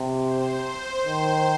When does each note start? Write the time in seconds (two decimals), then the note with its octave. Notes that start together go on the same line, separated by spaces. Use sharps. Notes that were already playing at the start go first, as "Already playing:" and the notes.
Already playing: C3
0.22 C5
1.05 D#3